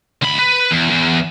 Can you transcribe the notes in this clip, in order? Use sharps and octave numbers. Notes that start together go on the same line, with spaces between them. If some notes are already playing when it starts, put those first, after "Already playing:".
D2 B5
B4
E2
E2